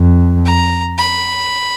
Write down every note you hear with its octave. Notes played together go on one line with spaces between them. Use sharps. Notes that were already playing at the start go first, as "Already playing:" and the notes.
Already playing: F2
A#5
B5